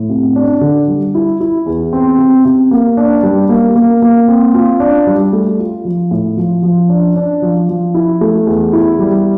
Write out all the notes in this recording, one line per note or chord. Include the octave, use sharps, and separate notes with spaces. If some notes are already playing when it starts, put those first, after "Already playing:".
Already playing: A2
C3
D4
D3
G3
E4
E4
E2
C4
C3
C3
A#3
D4
G3
A#3
A#3
A#3
C4
F4
D4
G3
A3
F4
F3
A2
F3
F3
D4
D4
F3
F3
E4
A3
E2
E4
G3